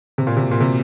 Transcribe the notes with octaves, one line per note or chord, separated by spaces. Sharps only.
C3
A#2
C3
A#2
C3